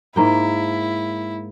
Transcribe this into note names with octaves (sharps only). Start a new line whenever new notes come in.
G#2 A#3 E4 G5